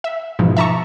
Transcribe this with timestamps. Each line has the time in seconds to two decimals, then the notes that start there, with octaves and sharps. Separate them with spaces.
0.04 E5
0.39 G#2 B2 E3 F3
0.57 E5 A5 A#5 C#6